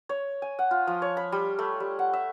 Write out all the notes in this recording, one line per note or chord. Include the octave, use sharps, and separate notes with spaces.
C#5
G#5
F#5
F4
F3
C#5
B5
G3
A3
G3
F#5
E5